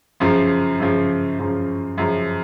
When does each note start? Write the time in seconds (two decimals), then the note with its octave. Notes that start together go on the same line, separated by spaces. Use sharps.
0.20 F#2 C#3 F3
0.80 F#2 C#3 F3
1.39 F#2 C#3 F3
1.98 F#2 C#3 F3